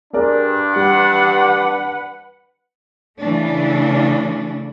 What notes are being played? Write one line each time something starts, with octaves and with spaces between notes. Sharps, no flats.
G2 D4 G#4 A#4 D5
G3 B4 F#5
C#3 E3 A3 D4